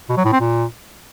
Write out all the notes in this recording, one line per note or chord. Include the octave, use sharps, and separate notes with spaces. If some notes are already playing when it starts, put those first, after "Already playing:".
B2
F#3
A2
C4
A#2